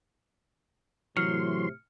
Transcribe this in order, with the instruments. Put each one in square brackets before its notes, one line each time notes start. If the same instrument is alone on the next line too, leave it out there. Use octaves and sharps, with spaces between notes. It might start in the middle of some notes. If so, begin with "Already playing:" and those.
[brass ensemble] A2 C3 [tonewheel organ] E3 C6 [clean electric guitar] F#3 [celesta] F6 C#7